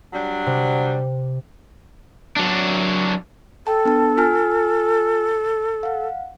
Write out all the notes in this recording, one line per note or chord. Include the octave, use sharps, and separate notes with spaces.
F#3 G3 D4
C3
F#3 D4
A4 G5 A5
B3 D4 A5
F4 G#5 F6
F5 F#5